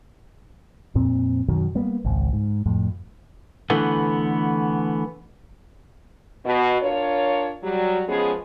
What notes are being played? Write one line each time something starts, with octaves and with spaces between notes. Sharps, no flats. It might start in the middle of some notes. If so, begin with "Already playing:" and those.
F2 A#2 C4
F#2 B2 D#3 F#3
G3 A#3 B3
G#1 C#2
G#2
F2 A2
D3 E3 A3 B3
B2
D4 F4 A#4 C#5
F#3 G3
F3 G#3 B3 C#4 G#4